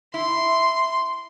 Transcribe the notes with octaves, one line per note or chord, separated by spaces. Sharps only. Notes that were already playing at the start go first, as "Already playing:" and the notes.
E4 C6